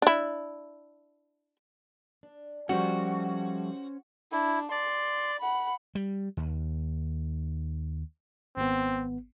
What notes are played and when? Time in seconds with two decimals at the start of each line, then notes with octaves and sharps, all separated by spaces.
0.02 D4 E4
2.23 D4
2.69 F3 G3 A3 C#4 F#4 C5
4.32 D4 E4
4.71 D5 C6
5.40 F#5 B5
5.95 G3
6.37 D#2
8.57 G#1 B3 C4